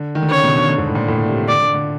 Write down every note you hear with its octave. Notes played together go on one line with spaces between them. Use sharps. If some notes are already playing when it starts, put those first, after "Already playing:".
Already playing: D3
D#3
D3
C#3 C#5
B2
D3
D3
G#2
A2
A#2
A2
C3
D3 D5
D3
D3